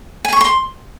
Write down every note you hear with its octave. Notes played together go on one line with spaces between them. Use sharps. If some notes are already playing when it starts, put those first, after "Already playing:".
G#5
C#6
C6